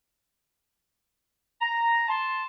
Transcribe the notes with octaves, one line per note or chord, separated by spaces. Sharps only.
A#5
A5 C6